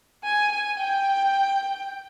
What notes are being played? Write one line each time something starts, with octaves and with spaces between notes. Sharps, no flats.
G#5
G#5
G5